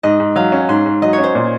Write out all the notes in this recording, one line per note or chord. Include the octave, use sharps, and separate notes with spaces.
G#2 D#5
G#2
F#3 F5
C#4
G#2 C6
G#2
F#3 D#5
C#5
C#4
C5
A#2